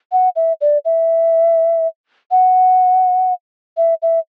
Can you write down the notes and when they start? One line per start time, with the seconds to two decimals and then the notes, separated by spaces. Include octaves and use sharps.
0.12 F#5
0.36 E5
0.61 D5
0.85 E5
2.31 F#5
3.77 E5
4.02 E5